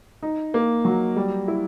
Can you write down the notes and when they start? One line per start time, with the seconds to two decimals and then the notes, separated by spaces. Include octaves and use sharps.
0.22 D#4
0.54 A#3
0.85 F#3
1.16 G3
1.48 E4